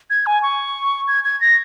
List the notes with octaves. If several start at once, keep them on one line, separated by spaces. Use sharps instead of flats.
G#6
G#5
C#6
G#6
G#6
A#6